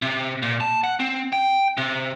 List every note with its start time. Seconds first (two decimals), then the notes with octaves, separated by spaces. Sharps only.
0.02 C3
0.42 A#2
0.60 A5
0.84 F#5
1.00 C4
1.33 G5
1.77 C3